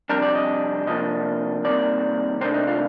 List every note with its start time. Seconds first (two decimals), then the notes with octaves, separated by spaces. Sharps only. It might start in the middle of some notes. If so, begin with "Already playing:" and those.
0.09 F2 C3 G3 D4 A#4
0.22 D5
0.35 D#5
0.87 C3 F3 A#3 D4 D#5
1.64 C2 C3 D#3 A#3 D5
2.41 C3 D#3 A3 D4 C5
2.54 D#4
2.67 F4